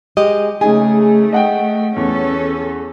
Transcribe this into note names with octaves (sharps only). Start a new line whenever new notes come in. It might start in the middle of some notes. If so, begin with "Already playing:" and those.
G#3 G4 D#5
C#3 A3 D#4 G#4 G#5
D#5 F#5 G5
E2 C#4 A4